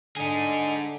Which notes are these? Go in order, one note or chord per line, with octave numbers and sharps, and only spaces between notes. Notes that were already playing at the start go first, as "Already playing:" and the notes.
D3 D#4 G#4